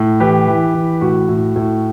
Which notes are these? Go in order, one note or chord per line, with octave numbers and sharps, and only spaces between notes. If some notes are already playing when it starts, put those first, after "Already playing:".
Already playing: A2
E3 G4 B4
E3
E3
A2 F#4
A2
A2